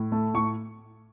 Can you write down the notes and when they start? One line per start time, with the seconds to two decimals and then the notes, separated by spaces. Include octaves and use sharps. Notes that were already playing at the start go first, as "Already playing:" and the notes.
Already playing: A2
0.12 A3
0.34 A2 C#6